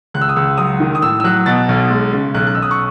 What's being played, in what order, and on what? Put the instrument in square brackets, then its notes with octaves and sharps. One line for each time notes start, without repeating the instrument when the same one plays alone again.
[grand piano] C#2 F#6
E6
D#6
C#2 E6
F#3 D#6
D#3
D#6
A2 E6
E6
F#3 F#6
B2 A6
B1
G#3
C#3
B1 F#6
F#6
B1 E6
D#6
C#6